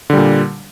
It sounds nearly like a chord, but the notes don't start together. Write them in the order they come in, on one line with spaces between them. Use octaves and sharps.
D3 G3 A#2